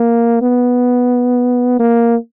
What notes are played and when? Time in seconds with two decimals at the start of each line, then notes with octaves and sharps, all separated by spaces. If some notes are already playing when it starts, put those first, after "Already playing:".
Already playing: A#3
0.41 B3
1.79 A#3